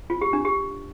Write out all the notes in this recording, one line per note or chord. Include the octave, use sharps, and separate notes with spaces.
F4
G4
D4
G4